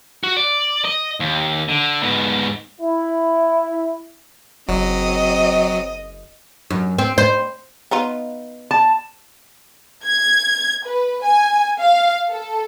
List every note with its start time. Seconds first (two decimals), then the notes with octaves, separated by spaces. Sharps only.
0.24 F#4
0.37 D5
0.85 D#5
1.20 D#2
1.69 D3
2.03 G#2 B3
2.80 E4
4.68 F#1 F#3 C4 D#5
6.70 F#2
6.99 C4
7.18 C5
7.91 B3 D#4 F4
8.71 A5
10.04 G#6
10.85 B4
11.22 G#5
11.79 F5
12.29 A4